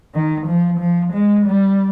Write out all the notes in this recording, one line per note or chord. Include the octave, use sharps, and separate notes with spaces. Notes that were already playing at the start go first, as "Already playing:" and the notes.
D#3
F3
F3
G#3
G3